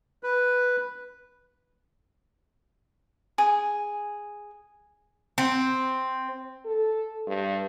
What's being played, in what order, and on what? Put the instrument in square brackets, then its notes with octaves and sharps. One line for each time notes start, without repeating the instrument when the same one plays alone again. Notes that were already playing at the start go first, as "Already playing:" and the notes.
[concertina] B4
[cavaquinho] G#4
[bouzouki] C4
[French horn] A4
G2